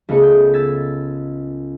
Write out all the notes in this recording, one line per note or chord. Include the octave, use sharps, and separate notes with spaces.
C#2 A3 B3 B4 C#5 C#7
G6
E6 G#6 A6 B6